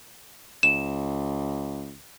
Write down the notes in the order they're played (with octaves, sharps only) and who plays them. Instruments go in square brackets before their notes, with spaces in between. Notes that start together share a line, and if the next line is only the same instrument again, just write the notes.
[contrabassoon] C#2 [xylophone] E7